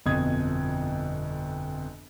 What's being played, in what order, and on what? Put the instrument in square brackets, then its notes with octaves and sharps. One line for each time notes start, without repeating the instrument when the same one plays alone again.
[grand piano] G1 F2 B2 D#6 G#6